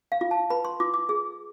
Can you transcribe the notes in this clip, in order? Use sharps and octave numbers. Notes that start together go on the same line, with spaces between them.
F5
F4
A5
B4 B5
C6
F4 D6
D6
G#4